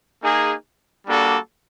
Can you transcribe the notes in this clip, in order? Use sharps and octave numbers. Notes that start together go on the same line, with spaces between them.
A#3 D#4 G#4
G3 A#3 D4 F#4 A4